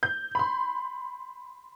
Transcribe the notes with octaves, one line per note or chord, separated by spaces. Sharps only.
G6
B5 C6